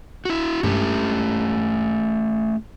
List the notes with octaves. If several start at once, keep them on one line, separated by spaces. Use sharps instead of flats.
E4 F#4
G2 G#3 A3 C#4 G4